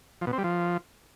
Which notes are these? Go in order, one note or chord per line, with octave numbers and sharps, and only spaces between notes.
F3
B2
C4
G3
F3